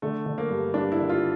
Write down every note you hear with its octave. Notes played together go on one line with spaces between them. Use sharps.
D3 A3
D3
A#3
G2
G2 D4
E4
D3
F4